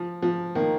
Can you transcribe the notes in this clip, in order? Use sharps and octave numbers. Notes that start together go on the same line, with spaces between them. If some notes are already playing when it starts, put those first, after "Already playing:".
Already playing: F3
F3
D#3 A#3